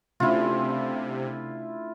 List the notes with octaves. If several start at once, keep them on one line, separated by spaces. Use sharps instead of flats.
C3 A3 C#4 D4 E4 F4